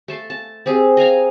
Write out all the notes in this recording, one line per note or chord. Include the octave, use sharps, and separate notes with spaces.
A3 A5 C6
A5
C4 G4 G#4
D#5 F5 G#5 A#5